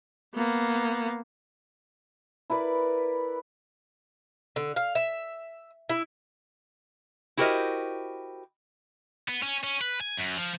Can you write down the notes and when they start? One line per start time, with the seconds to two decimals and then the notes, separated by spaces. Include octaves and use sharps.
0.34 A#3 B3
2.50 E4 A#4 B4 D5
4.56 D3
4.76 F5
4.95 E5
5.90 E4
7.37 E4 F#4 G4 A#4 C5 D#5
9.28 B3
9.43 C#4
9.64 C#4
9.81 B4
10.01 G#5
10.17 F#2
10.37 F3